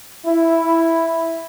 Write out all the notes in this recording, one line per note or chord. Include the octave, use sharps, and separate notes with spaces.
E4